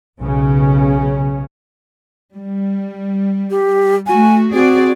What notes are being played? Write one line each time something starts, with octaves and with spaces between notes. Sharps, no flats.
B1 C#3 C#4
G3
G4
A3 F#4 G#5
C4 F#4 G#4 D5